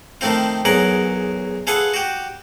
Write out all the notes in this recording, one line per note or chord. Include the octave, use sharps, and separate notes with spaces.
D#3 F3 A3 C4 F4
B1 E2 F#3 G#4 A#4 F#5
F4 G#4 A4 B4 F#5
F#4 G4